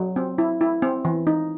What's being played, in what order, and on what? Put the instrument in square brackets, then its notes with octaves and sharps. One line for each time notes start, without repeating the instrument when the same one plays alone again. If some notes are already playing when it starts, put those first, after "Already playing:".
Already playing: [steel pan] F#3
C4
E4
E4
C4
E3
D#4